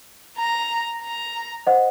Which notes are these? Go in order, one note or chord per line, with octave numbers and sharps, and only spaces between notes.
A#5
A#5
C5 D#5 F#5